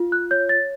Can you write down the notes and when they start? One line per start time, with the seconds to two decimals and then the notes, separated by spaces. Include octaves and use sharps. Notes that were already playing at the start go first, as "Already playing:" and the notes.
Already playing: F4
0.12 F#6
0.31 C#5 G6
0.49 A6